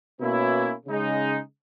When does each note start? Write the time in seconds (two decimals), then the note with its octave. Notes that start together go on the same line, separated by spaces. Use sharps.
0.20 B2 A#3 C#4 E4
0.86 C#3 G#3 D#4